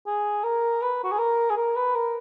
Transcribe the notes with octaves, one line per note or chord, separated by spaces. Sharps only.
G#4
A#4
B4
F#4
G#4
A#4
G#4
A#4
B4
A#4